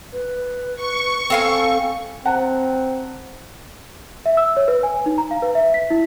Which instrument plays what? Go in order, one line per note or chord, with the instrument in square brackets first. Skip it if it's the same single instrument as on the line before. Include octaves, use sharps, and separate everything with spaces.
[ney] B4
[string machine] C#6
[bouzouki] C4 F5 G#5 [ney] A4
[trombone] C4 [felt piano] F#5 A5 A#5
[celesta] E5
E6
C#5
B4
G#5
D#4
A#5
F5
B4
E5
B6
E4